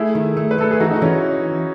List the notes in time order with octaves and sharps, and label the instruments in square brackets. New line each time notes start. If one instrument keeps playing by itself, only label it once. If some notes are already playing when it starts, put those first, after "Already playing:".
Already playing: [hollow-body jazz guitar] A3 [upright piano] E4 G#4
[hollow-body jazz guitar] D#3
A3
[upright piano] B4
[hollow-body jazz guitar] A3 [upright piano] A4
[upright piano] G#4
[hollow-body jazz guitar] E3 [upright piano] D#4 F#4
[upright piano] D#4 F#4
[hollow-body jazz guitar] E3 [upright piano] C#4 E4